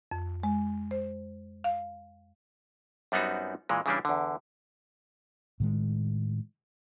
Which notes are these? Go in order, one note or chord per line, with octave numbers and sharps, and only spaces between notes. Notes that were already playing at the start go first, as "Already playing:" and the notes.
F2
G#3
C5
F5
F#2 G3 B3 C4 D#4 F#4
A#2 E3 G#3
C#3 E3 G3 C#4 D4
E2 D3
A2 D#3 G#3